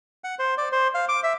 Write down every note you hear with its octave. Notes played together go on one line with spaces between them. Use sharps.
F#5
C5
D5
C5
F5
D6
E5